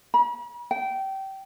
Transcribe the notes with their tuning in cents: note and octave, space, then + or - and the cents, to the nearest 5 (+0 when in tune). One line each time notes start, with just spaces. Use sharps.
B5 -45
G5 -20